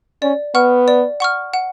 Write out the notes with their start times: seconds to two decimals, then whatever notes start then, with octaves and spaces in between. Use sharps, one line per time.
0.22 C#4 D5
0.55 B3 F#5 C#6 F6
0.88 D5
1.20 F#5 C#6 F6
1.53 F#5